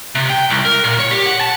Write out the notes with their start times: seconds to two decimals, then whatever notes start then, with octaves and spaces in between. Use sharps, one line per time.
0.15 C3
0.30 G5
0.50 C2
0.65 A#4
0.84 A#2
0.99 C#5
1.11 G4
1.26 F#5
1.41 A5